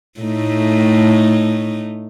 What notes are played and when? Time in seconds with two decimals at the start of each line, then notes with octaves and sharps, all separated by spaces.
0.20 A2 A3 D#4